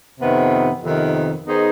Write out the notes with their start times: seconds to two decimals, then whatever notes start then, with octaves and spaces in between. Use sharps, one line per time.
0.20 F2 C3 D#3 B3
0.82 F2 C3 D#3 B3
1.44 D#3 B3 D#4 G#4 C5